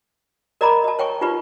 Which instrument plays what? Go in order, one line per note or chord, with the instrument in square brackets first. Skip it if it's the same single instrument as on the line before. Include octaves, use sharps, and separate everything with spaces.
[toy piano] A#4 D5 D#5 A#5 B5 D6
D#5 A5
C#5 G5 G#5 C#6
D#4 F4 G4 B4 D5 C#6